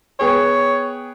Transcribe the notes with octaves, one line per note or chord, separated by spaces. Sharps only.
B3 G#4 C#5 G5